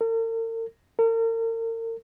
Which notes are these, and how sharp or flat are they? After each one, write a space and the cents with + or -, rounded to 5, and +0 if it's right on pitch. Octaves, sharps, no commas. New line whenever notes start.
A#4 -45
A#4 -40